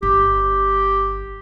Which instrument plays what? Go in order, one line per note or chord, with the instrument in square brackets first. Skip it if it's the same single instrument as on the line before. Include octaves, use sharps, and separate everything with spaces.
[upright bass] G1 [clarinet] G4